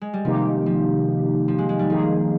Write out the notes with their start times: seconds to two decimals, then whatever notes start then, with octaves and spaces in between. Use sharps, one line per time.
0.01 G#3
0.14 G3
0.25 C3 D#3 F3 A#3 D#4 G4
0.66 F3
1.48 F3
1.58 G#3
1.69 G#3
1.79 G3
1.90 D#3 F3 A#3 D#4 G#4